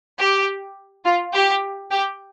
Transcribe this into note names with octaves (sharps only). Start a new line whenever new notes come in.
G4
F4
G4
G4